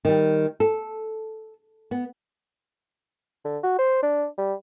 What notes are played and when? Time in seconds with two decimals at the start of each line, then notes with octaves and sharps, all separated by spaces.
0.05 D#3 G3
0.60 A4
1.91 B3
3.45 D3
3.64 F#4
3.79 C5
4.03 D4
4.38 G3